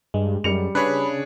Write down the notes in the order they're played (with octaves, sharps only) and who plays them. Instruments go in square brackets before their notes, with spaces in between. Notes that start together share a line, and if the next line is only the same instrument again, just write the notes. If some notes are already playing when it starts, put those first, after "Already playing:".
[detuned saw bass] G2 [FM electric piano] G#3
[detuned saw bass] F#2 [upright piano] G3 C#7 F7
[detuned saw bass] C#3 [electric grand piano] D4 G#4 C#5 [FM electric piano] B4 B5